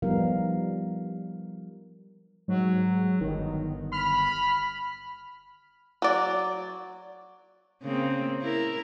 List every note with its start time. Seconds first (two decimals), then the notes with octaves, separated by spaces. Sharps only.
0.02 F3 G3 B3 D#4 A#4 F5
2.48 G#2 F#3
3.21 G1 D#3
3.93 B5 F6
6.02 F#3 D5
7.82 C#3 A#3 C4
8.41 E4 A#4